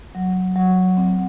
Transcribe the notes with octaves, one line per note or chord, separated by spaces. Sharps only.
F#3
F#3
C4